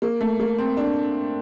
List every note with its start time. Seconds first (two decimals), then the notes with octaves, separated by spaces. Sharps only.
0.02 A#3
0.21 A3
0.40 A#3
0.58 C4
0.77 D4